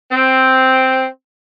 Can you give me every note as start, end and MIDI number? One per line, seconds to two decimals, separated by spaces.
0.11 1.06 60